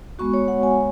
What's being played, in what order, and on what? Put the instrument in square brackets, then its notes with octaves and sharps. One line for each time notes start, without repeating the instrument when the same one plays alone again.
[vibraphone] G#3 B3 F#4 C#6
C#5
F#5
G#5